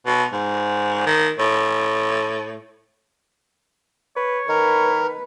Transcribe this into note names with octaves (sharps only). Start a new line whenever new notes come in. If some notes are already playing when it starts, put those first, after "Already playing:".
B2
G#2
D#3
A2
B4 C#5
D#3 A#4 B4